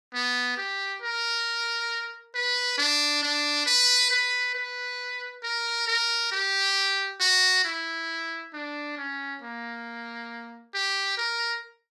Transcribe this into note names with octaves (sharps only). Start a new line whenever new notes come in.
B3
G4
A#4
B4
D4
D4
B4
B4
B4
A#4
A#4
G4
F#4
E4
D4
C#4
A#3
G4
A#4